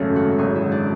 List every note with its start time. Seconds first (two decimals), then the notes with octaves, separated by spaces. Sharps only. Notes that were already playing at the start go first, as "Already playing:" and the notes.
Already playing: G#1 F#2 C#3 A3
0.16 F#4
0.39 G#1 F#2 C#3 G#4
0.55 E4
0.72 D4